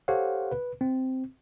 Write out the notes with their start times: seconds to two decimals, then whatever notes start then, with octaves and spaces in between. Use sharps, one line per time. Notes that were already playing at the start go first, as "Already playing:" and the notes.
0.08 G4 A4 C5 C#5 F5 F#5
0.51 B4
0.81 C4